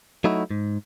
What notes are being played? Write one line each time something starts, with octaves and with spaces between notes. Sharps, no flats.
F#3 A3 D#4 E4 F#4
G#2